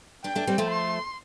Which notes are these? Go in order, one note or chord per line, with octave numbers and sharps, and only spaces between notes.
D4 G4 G5
A3 D4
G3 C4
F3 A3
C6